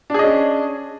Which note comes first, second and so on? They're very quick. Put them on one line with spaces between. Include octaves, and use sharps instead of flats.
D4 G#4 D#5 C#4